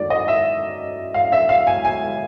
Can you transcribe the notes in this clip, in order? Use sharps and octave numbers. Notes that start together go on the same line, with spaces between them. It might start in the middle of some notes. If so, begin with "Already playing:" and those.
Already playing: F#2 D#3 F#3 A3 D5
D#5
E5
F5
E5
F5
G#5
G#5